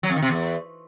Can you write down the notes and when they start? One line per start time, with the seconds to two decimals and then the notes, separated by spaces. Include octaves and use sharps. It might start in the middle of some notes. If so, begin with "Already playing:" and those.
0.03 F#3
0.10 F2
0.16 D#3
0.22 C3
0.29 E2